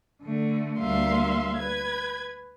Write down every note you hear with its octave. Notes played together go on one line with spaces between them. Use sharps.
D3 A3
D2 G3 A#3 E5 F5 C6
B4 G#6